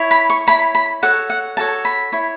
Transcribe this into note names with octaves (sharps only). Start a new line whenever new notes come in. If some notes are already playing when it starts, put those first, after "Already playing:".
Already playing: E4 C#5
B5
C#6
E4 C#5 B5
B5
F#4 A4 C#5 F#5
F#5
F#4 A4 C#5 A5
B5
E4 C#5